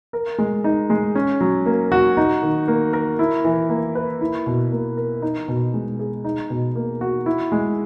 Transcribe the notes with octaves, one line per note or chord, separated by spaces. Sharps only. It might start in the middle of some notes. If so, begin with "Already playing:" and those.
A#4
G#3
D#4
G#3
C#4
F#3
A#3
F#4
D#4
D#3
A#3
A#4
E4
E3
A#3
B4
E4
B2
A#3
A#4
D#4
B2
G#3
G#4
D#4
B2
A#3
F#4
E4
G#3